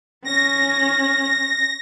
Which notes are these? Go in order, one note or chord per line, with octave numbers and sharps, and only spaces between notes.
C#4 A#6